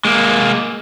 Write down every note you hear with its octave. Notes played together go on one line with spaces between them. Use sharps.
G#3 A#3